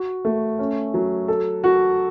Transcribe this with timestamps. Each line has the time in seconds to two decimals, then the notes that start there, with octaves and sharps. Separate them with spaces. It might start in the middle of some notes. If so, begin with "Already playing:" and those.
Already playing: F#4
0.25 A3
0.59 C#4
0.94 F#3
1.28 A4
1.64 F#4